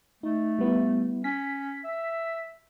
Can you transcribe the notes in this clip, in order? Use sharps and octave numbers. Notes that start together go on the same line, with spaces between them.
A3 D#4
G3 B3 E4
C#4 B6
E5